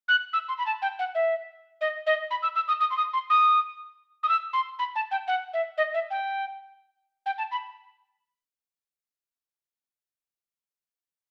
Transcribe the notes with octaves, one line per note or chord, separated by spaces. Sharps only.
F#6
E6
C6
B5
A5
G5
F#5
E5
D#5
D#5
B5
E6
E6
D#6
D#6
C6
D#6
C6
D#6
D#6
E6
C6
B5
A5
G5
F#5
E5
D#5
E5
G5
G5
A5
B5